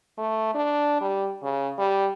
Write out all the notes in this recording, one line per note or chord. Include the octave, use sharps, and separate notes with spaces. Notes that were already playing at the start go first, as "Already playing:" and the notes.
A3
D4
G3
C#3
G3